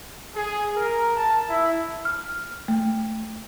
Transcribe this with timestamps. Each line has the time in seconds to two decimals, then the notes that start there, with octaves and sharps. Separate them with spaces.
0.35 G#4
0.77 A#4
1.16 A5
1.49 E4
2.05 F6
2.68 A3